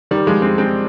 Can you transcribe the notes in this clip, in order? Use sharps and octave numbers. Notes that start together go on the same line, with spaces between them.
D#3 G3
F3 G#3
G#3 C4
G#3 C4